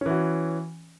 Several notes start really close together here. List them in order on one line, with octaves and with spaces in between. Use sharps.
C#4 E3 F#4